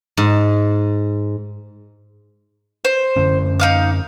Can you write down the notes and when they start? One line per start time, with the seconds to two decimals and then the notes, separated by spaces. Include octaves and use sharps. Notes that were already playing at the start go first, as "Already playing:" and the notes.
0.17 G#2
2.85 C5
3.16 F#2 D3 C#4
3.60 D#4 F5 D6